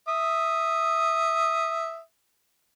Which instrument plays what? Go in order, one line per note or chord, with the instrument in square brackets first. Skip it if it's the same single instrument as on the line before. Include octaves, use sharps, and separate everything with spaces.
[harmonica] E5 D#6